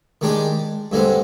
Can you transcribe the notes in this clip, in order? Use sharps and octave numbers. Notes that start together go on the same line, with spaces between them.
D#3 G#3 D4 G4
G2 D3 G#3 C4